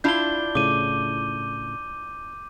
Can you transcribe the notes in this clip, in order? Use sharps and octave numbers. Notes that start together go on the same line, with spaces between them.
D4 E4 F4 G6 G7
A2 C#3 D6 D#7